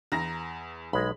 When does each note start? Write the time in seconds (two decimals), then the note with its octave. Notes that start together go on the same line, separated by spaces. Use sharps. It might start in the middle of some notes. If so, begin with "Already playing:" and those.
0.12 E2 A#5 A#6
0.93 B1 G#3 B5